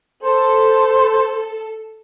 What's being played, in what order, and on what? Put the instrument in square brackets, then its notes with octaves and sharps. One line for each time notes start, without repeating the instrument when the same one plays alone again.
[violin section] A4 [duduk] C5